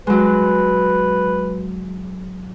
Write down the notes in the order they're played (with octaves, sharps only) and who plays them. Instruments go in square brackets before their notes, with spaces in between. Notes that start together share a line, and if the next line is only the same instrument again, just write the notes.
[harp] F#3 G#3 [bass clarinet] B4